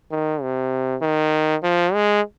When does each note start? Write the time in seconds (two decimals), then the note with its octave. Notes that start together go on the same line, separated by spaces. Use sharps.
0.11 D#3
0.42 C3
1.01 D#3
1.63 F3
1.94 G#3